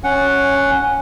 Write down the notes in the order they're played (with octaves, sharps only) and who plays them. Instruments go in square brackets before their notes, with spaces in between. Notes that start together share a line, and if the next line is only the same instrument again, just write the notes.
[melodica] C#4 F#5